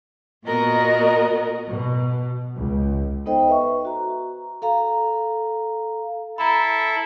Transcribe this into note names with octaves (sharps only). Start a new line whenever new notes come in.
A#2 B3 F#4 A#4 D#5
B2
C#2
B3 D#4 A4 C5 D#5 G5
B4 E5 C#6
F#4 A#5
A4 F5 A#5
E4 A4 A#5 B5